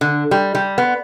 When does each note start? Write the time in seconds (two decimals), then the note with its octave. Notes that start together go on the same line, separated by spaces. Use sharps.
0.01 D3
0.31 G3
0.55 G3
0.78 B3